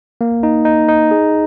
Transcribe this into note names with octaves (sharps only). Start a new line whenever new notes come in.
A#3
D#4
D#4
D#4
G#4